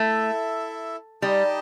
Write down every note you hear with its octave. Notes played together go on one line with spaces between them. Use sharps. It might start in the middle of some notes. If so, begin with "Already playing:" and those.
Already playing: A3 E4 A4 E5
G3 D#4 G4 D#5 A5